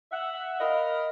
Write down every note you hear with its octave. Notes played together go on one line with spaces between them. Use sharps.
E5 F#5
A#4 D#5 F5 B5